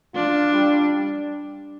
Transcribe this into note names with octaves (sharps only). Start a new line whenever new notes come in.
D4 F4
G3